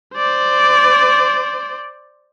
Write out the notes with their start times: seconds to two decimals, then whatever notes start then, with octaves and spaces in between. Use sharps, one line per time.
0.15 C5 D5